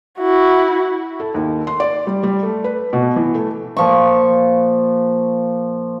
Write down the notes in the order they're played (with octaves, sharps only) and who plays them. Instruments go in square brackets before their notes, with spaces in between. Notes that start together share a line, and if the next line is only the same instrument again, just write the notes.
[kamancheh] E4 F#4
[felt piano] A4
D#2
C6
D5
G3
G3
A3
B4
B2
E3
A3
[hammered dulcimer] A#2 F3 C#6